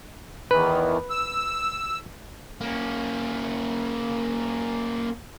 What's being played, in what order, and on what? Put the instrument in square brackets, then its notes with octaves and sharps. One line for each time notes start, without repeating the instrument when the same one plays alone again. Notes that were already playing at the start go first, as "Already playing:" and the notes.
[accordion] E2 D#3 E3 [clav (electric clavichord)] B4
[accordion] E6
[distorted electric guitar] A#3 C#4